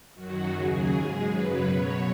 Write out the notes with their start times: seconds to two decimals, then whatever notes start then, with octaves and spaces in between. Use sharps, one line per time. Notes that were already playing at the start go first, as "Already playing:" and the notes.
0.14 F#2 D#3 F#3 F#4
0.51 D#2 C#3 F#3 G#4
0.89 G#2 G#3
1.26 F#2 C#3 F#3 B4
1.63 B2 F#3 C#5